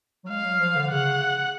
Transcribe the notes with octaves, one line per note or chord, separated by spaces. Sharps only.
F#3
G#3 F5
F#3
F3
D3
C#3 F#5
C#3
C#3